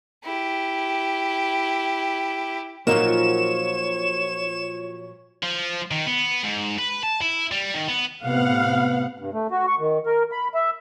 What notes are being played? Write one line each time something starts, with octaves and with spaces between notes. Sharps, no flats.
E4 G4
A#2 F3 F#3 A#3 D#4 C#5 E7
F3
D#3
B3
G#2
B4
A5
E4
G3
D#3
B3
A2 C3 B3 F5 F#5
G2
A3
F#4
C#6
D#3
A#4
B5
E5